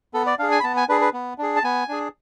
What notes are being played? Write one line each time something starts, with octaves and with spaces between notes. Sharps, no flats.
B3 A4
D5
D4 G#4 F5
G#5
B5
B3 A5
G#5
D4 G#4 B4
B4
B3
D4 G#4
A5
B3 G#5
D4 G#4